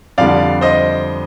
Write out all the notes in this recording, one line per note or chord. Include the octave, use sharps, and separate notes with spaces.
F2 D3 G3 D5 F5
C5 D#5